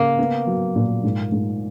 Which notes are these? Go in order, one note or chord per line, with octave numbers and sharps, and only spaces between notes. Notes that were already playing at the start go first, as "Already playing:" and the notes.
Already playing: C#3 A#3
B3
F#3
A#2
G#2
G#2